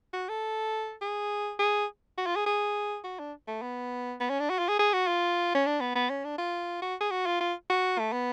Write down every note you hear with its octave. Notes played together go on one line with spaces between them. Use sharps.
F#4
A4
G#4
G#4
F#4
F4
G#4
G#4
F#4
D4
A3
B3
B3
C#4
D4
F#4
F4
G#4
G#4
F#4
F4
C#4
D4
B3
B3
C#4
D4
F4
F#4
G#4
F#4
F4
F4
F#4
A3
B3